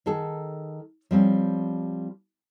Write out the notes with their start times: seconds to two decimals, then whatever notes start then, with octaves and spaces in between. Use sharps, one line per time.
0.06 D#3 G#4 A4
1.11 F3 G3 C4 C#4